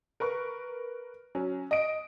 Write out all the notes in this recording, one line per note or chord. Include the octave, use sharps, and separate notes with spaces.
A#4 B4 C#6
F#3 C#4
D#5 D7